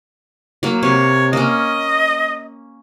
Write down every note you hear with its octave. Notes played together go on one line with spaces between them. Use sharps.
F#3 A#3
C3 C#5
A#3 C#4 D#5